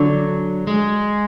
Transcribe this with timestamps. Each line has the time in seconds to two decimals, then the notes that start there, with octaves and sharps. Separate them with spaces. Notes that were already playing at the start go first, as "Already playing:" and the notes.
Already playing: D3 F#3
0.67 G#3